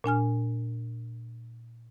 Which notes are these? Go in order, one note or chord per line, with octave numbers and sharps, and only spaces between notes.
A#2 D4 G#5 F6